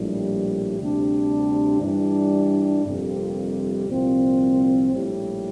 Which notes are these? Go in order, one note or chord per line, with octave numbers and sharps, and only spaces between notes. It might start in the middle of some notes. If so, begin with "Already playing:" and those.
Already playing: A#1 A2 G3
D2 C3 G3 D4
G2 E3 G3 D4
G1 F2 C3 G3 A#3
C2 A#2 F3 C4 F4
A#1 A2 G3